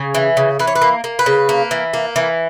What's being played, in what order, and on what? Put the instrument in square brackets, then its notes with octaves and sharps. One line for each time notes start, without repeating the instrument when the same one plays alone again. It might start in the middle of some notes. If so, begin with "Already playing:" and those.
Already playing: [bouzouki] C#3 G#5
E3
C#3
E3 B4
C#5
B4
A#3
A#3
B4
C#3
A#3
E3
A#3
E3